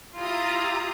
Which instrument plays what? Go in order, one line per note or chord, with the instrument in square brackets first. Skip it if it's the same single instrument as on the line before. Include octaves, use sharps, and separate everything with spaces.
[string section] E4 F4 G4 A#5 D#6